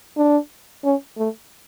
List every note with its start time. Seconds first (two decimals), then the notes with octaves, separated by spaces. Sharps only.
0.17 D4
0.84 C#4
1.18 A3